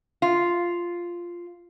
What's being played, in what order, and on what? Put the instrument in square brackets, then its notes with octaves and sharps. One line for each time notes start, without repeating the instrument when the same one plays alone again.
[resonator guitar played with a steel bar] F4